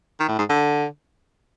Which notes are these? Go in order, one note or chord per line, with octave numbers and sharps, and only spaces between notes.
D#3
A2
G#2
D3